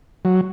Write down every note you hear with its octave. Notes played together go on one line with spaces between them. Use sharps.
F#3